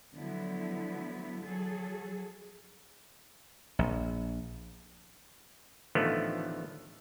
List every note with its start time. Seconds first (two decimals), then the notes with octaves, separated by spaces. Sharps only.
0.14 D3 F3 F#3 A3 B3 E4
1.43 F3 F#3 G#4 A4
3.79 A#1
5.95 A1 D3 D#3 F3 A3 B3